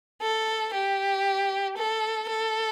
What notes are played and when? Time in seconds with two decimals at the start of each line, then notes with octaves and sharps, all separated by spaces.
0.22 A4
0.74 G4
1.78 A4
2.30 A4